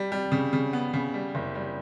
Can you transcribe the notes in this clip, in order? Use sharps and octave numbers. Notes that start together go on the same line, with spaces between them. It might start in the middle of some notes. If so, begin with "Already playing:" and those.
Already playing: G3
G3
C#3
C#3
B3
C#3
G3
F#1
G3